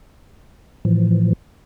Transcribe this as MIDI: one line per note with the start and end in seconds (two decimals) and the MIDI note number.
0.85 1.33 45
0.85 1.33 52
0.85 1.33 53